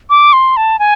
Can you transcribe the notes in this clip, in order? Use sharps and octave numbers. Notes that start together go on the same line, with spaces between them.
D6
C6
A5
G#5